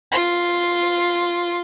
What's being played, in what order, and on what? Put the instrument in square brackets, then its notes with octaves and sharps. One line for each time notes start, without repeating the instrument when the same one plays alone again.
[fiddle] F4 C6